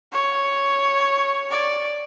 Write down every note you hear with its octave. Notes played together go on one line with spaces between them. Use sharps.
C#5
D5